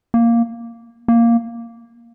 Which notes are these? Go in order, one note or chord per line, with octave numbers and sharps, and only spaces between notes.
A#3
A#3